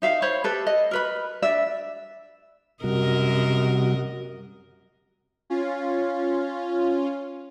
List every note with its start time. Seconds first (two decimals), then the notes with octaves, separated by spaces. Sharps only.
0.02 D#4 E5 F5
0.22 C5 C#5 B5
0.44 G4 A4 B4
0.67 D#5
0.91 A#4 B4 B5
1.42 D4 D5 E5
2.84 F#2 C3 G3 F#4 A#4 D#5
5.50 C#4 F4